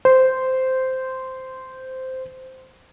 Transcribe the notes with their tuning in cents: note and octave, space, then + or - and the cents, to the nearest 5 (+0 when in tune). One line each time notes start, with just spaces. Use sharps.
C5 -10